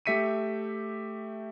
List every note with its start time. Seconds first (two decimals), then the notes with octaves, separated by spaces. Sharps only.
0.06 A3 G4 E5 B6 C#7 D#7